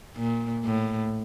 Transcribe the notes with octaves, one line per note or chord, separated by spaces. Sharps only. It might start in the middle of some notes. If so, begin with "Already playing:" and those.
A#2
A2